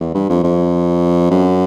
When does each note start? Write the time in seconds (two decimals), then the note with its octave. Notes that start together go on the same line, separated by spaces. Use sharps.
0.01 E2
0.15 G2
0.30 F2
0.44 F2
1.31 F#2